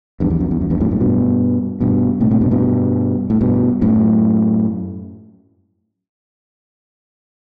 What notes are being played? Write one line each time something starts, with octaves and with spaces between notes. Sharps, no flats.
E2 G2
E2
F#2
E2
F#2
E2 G2
F#2 A2
F#2 A2
G2 B2
G2 B2
A2 C3
A2 C3
G2 B2
G2 B2
A2
G2 B2
F#2 A2